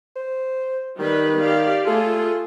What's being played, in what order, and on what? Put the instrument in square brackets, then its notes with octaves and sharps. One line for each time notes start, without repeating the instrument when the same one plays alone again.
[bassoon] C5
[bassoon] D#3 [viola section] G3 B4
[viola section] G4 D5 F5
[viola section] A3 F4 G#4 [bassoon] A4